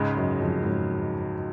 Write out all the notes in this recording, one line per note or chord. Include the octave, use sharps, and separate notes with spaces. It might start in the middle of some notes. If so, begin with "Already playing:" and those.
Already playing: C#2 G#2 C#3 G#3
F#2
F2
G#2
F#2